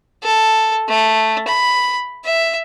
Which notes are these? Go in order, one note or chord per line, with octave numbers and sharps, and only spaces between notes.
A4
A3
B5
E5